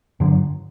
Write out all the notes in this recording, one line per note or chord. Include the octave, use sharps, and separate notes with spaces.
G2 D3 F#3